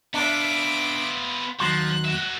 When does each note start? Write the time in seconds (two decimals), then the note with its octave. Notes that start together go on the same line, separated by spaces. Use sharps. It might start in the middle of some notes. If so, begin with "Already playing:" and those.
0.14 B3 D4 F4 E5 D6
1.60 D#2 F3 F#3 C6 F#6
2.05 F#4 E5